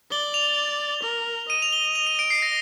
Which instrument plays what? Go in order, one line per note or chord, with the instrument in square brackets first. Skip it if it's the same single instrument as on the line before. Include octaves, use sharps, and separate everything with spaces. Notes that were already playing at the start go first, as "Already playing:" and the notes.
[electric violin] D5 [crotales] G7
[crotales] F7
[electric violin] A#4
[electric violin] D#5 [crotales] D#7
[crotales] F7
G7
F7
D#7
D7
C7
A#6